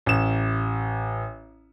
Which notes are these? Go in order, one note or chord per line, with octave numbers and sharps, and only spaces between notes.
A1 E7